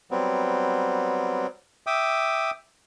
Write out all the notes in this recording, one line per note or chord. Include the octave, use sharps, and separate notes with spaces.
F#3 G3 B3 C4
E5 G5 D6 D#6